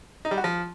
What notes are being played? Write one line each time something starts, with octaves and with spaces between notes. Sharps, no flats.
D#4
G3
F#4
F3